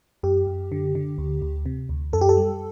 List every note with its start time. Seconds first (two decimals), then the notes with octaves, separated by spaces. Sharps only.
0.23 F#2 G4
0.47 F#2
0.72 D3
0.95 D3
1.18 D2
1.42 D2
1.66 C3
1.89 D2
2.13 F#2 A4
2.21 G4
2.29 A4
2.37 G3